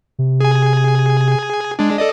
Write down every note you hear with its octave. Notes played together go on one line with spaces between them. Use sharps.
C3
G#4 G#5
G#3 D4
A4 D5 D#5